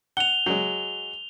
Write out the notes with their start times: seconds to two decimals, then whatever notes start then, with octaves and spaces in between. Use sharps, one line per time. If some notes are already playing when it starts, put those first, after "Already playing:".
0.17 F#5 F7 G7
0.46 F#3 G#3